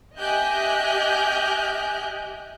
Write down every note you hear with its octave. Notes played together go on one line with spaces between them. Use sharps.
G4 D#5 E5 G#5 F#6 G6